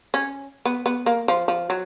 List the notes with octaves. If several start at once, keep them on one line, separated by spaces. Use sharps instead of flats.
C#4
B3
B3
A#3
F3
F3
F#3